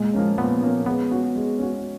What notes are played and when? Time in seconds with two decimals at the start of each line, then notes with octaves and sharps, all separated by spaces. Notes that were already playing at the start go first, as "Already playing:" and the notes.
Already playing: A#2 G#3
0.13 F3 A#3 C#4
0.38 A#2 B3
0.62 F3 A#3 C#4
0.86 G#3 B3
1.11 C#4 F#4
1.35 G#3
1.59 C#4 F#4